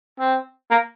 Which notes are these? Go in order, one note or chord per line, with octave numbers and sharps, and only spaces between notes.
C4
A#3